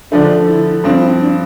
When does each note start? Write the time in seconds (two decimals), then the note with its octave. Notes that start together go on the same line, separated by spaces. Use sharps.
0.12 D3 F3 A3 D4
0.48 E4
0.84 G2 F3 C4 D4
1.02 E4
1.20 D4